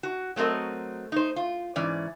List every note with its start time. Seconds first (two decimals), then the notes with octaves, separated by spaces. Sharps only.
0.03 F#4
0.36 F#3 A3 C4 A#4 D#5
1.12 D#4 C5
1.36 F4
1.76 G#2 E3 C#4 D5